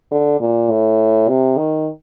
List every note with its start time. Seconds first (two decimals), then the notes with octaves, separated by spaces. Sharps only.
0.12 D3
0.40 A#2
0.70 A2
1.29 C3
1.58 D#3